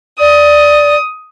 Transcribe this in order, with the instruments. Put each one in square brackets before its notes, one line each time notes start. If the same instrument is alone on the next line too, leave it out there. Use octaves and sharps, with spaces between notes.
[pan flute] D5 [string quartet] D#6